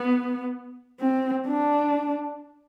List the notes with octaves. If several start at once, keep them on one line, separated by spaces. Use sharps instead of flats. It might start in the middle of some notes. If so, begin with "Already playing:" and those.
Already playing: B3
C4
D4